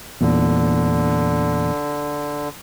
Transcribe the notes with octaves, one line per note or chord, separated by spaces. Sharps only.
E2 A#2 D3